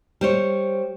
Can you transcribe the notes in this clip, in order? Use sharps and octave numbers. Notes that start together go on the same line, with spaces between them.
G3 C5 C#5